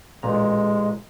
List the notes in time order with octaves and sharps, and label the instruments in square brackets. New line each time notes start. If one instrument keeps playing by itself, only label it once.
[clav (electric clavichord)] A1 A#2 A#5 [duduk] G#3